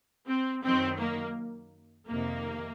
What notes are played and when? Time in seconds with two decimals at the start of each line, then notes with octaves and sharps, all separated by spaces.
0.28 C4
0.64 F#2 D#3 F#3 C4
0.99 A#3
2.07 F2 C3 D#3 A#3